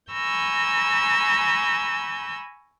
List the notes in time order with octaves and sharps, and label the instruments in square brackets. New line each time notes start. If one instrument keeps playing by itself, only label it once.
[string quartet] G#5 A#5 B5 C#6 E6 G6